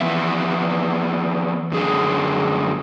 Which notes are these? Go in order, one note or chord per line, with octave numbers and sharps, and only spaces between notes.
E3 F3 B3 E5
F#2 D3 G#4